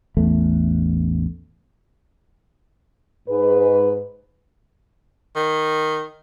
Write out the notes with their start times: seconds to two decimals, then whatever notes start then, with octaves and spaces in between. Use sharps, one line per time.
0.17 A1 E2 A3
3.29 G#2 B4
5.36 D#3